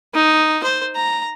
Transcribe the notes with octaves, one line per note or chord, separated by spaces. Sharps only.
D#4
C5
A#5